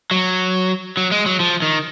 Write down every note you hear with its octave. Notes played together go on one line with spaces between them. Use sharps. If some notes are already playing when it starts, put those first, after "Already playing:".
F#3
F#3
G#3
F#3
F3
D#3